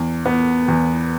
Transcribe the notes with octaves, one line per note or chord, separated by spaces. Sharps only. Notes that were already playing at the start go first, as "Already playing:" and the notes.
Already playing: E2
B3
E2